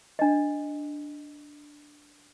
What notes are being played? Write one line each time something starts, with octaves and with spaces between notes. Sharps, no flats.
D4 D#5